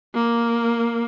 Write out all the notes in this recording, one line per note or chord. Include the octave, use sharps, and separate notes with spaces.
A#3